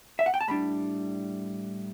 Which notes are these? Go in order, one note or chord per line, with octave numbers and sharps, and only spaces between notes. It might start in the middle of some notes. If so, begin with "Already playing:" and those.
E5
F#5
G5
A5
A2 G3 D4 B5